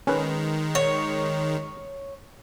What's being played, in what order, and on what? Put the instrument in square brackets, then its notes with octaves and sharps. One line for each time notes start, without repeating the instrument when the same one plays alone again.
[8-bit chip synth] D#3 G#3 [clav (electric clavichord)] C#4 B4
[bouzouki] C#5